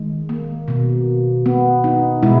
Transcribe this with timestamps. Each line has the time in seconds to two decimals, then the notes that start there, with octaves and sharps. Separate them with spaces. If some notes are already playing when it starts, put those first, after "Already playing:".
Already playing: D#3 G#3
0.29 A#3
0.68 B2 A#3
1.46 B3
1.84 D#4
2.23 B2 G#3 E4